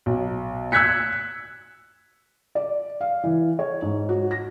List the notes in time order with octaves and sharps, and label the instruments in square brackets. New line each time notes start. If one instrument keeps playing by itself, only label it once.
[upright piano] B1
E6 F#6 G#6 B6 C#7
[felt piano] D5
F5
E3
C#5
G#2
F#4
A#6